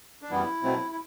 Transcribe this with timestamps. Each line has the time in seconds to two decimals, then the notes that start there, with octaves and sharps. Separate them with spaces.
0.22 D4
0.30 F#2 E3 G3 B3 E4
0.63 B2 F#3 A3 C4
0.92 E4